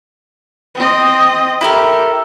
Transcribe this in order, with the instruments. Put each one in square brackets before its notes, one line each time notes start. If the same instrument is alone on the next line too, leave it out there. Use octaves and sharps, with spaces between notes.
[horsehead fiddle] C4 D#5
[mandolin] E4 A4 A#4 [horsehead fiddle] G4